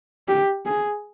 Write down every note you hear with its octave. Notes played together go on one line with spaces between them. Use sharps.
G4
G#4